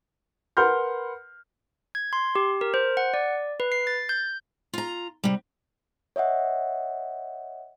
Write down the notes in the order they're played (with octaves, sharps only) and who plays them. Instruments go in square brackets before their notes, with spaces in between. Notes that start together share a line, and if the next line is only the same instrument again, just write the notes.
[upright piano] A#4 B4 F#5 C6 F6 G6
[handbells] G#6
C6
G4
A#4
C5
F#5
D5
B4
C7
A6
G6
[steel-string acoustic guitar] F4 A#5
C3 G3
[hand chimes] C#5 D#5 E5 F#5